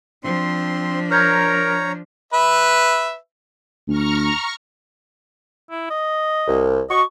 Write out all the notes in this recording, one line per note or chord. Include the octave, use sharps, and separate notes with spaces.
F3 C4 D4 C6
A#4 C#5 A#5 F6 G6 G#6
B4 E5
D2 A#5 C#6 F6
E4
D#5
C2
F#4 D#5 C#6